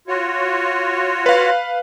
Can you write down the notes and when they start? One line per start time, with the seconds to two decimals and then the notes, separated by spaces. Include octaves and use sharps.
0.08 F4 F#4 C#5
1.26 B4 F5